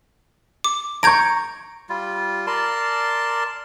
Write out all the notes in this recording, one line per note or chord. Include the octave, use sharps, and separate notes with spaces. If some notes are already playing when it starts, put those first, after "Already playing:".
D6
A#5 C#6 G6 G#6 D7
G3 F4
A#4 D5 A5 C6